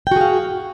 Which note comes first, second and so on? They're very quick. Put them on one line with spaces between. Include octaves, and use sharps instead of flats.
G5 F#4 G#4 F5